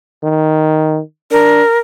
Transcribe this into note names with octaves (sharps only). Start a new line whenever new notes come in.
D#3
D4 A#4